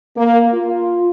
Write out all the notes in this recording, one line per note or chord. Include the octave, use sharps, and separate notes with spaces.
A#3
F4